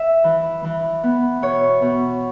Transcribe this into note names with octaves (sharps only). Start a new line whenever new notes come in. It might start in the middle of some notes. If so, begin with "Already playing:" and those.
Already playing: E5
E3
E3
B3
B2 C#5
B2